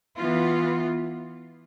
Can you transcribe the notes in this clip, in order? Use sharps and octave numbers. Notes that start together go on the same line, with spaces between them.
E3 B3 F4